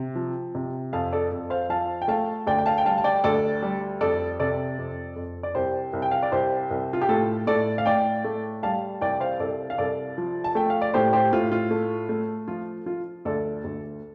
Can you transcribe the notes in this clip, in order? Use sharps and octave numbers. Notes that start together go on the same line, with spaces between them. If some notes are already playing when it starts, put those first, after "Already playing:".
Already playing: C3
F3
C3
F2 F5 A5
A4 D5
F2
C5 F5
F3 F5 A5
G5
A3 F5 A5
D2 D5 G5
G5
F5 A5
G5
G3 F5 A5
A5
D5 G5
D2 A4 D5
G3
F2 A4 D5
C3 A4 D5
F2
F2
D5
C2 G4 C5
C2
G5
F5
D5
C2 G4 C5
C2
F4
G4
A2 F4 A4
A2 A4 D5
F5
A2 D5 G5
A3
G3 F5 A5
C2 D5 G5
C5 F5
C2 A4 D5
F5
C2 A4 D5
F3
A5
A3 G5
F5
D5
A2 G4 C5
G4 C5
A2 F4
F4
A3
A3
F3 F4
F3 F4
D2 A4 D5
D2